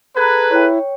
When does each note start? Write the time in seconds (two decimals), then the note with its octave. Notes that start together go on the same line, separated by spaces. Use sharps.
0.17 G#4 A4 B4 A#5 F#6 G#6
0.51 E4 C#5 G5